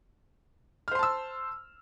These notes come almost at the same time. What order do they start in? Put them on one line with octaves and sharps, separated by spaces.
F6 C5 C6 A5 E6